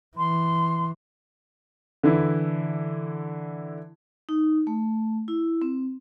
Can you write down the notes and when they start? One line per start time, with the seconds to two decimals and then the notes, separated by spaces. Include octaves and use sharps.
0.17 E3 C6
2.03 D3 E3 E4
4.29 D#4
4.67 A3
5.28 E4
5.62 C4